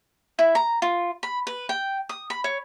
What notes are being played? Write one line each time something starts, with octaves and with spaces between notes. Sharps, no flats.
E4
A#5
F4
B5
B4
G5
D#6
B5
C#5